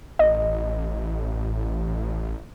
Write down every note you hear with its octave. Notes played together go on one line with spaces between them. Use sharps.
A1 D#5